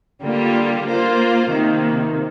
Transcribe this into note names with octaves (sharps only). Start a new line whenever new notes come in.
D3 G3 A#3 F4
A#3 F4 C5
C3 D#3 A#3